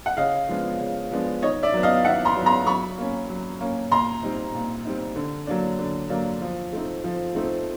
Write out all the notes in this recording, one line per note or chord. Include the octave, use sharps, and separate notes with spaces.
F#5
C#3 D#5 F5
F3 G#3 B3 D4
C#3
F3 G#3 B3 D4
D#3 C#5 D#5
D5 E5
F#3 B3
D#5 F5
D#3 E5 F#5
A#5 C6
F#3 B3
A#5 C6
F#3 B5 C#6
A#3 C#4
F#3
A#3 C#4
A#2 A#5 C6
G3 C4 D#4
A#2
G3 C4 D#4
D3
F#3 A#3 D4
D3
F#3 A#3 D4
F3
A3 C4 D#4
F3
A3 C4 D#4